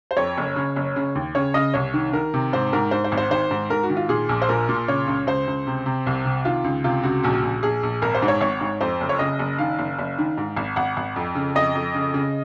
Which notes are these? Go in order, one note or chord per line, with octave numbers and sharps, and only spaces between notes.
C5
F2 C#5
F#1
C#3
F#1
C#3
D#2
C#3 C#5
C#3 D#5
C2 C#5
D#3
D#3 A#4
C3
G#2 C5
G#2 A#4
G#2 C5
C5
G#1
C5
D#3 C5
G#2
G#2 A#4
F#4
D#3
F4
A#2 G#4
A#1
C5
A#2 A#4
A#2
C#3 C#5
C#2
C#2 C5
C#2
C3
C3
C2
C3
D#3 F4
C#2
C3 F4
C#2 F#4
A#1 F#4
A#1
A#1 G#4
A#1
G#1 A#4
C5
G#2
C#5
G#1 C#5
G#2
F2 C5
F#1
C#5
C#3 D#5
F#1
D#3 F5
F#1
F#1
D#3
G#2
G#1
G#1 F#5
G#1
F2
C#3
F2 D#5
F2
C#3
C#3